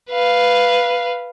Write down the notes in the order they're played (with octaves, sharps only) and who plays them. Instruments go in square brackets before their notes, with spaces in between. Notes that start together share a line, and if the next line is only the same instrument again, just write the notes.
[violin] B4 F5